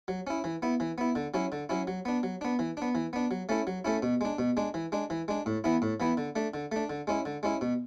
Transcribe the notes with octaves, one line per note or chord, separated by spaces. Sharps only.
F#3
C#4 E4
E3
B3 E4
E3
B3 E4
D3
F#3 C#4 E4
D3
F#3 C#4 E4
F#3
B3 D4
F#3
B3 D4
E3
B3 D4
E3
B3 D4
F#3
A3 C#4 E4
F#3
A3 C#4 E4
B2
G#3 D4
B2
G#3 D4
E3
G#3 D4
E3
G#3 D4
A2
E3 B3 E4
A2
E3 B3 E4
D3
A3 D4
D3
A3 D4
D3
G#3 C#4 E4
D3
G#3 C#4 E4
B2